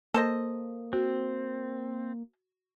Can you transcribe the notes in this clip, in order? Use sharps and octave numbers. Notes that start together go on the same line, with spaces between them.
A#3 A4 C5 D#5
C4 F#4